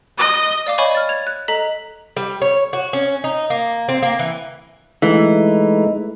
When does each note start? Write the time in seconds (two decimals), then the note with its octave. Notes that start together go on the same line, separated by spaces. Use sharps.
0.18 D#5
0.66 D5 F5 D6
0.78 C#5 D#5 G#5 B5 C#6
0.95 F6 A6
1.09 G#6 F7
1.27 F#6
1.48 A4 D#5 A#5 B6
2.16 G3
2.42 C#5
2.73 F#4
2.93 C#4
3.24 D#4
3.50 A#3
3.89 C4
4.02 A#3
4.19 E3
5.02 E3 G#3 A3 D#4